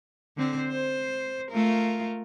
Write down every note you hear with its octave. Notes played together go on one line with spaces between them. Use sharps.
D3 C4 C5
C5
A3 F4 A#4